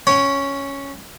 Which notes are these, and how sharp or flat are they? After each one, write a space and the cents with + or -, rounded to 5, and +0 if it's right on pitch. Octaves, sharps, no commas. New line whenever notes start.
C#4 +0 C#5 +0 F#5 +45